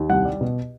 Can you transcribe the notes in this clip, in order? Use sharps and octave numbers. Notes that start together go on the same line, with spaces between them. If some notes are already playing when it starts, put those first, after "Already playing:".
Already playing: D#2
C2 F#5
G3
B2